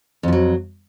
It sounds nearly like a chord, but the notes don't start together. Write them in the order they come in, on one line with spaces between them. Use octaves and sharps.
F2 F3 F#3